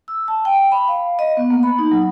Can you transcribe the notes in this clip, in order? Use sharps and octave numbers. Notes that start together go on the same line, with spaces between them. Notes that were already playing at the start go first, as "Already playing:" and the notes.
E6
A5
G5
B5
F5
D#5
B3
A#3
B5
D#4
F#3